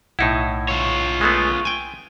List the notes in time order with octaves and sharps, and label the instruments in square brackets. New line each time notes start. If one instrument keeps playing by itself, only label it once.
[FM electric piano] B1 F#5 G#6 [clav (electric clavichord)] A2 D#4 E4
[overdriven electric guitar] F4 C#5
[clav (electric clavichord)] G#3 A3 B3
G5 G#5